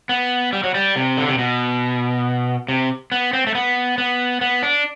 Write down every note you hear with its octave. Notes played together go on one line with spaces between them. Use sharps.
B3
G3
F#3
G3
C3
D3
C3
B2
C3
B3
C4
A3
B3
B3
B3
D4